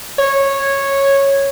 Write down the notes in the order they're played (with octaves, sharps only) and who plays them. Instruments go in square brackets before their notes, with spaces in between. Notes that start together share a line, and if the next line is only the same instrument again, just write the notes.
[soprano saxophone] C#5